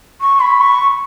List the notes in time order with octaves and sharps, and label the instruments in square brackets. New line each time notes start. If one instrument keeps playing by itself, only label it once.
[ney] C#6
B5
C#6